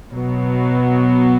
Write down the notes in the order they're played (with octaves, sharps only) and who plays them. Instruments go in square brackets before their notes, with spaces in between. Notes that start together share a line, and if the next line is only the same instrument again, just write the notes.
[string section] B2 F#3 B3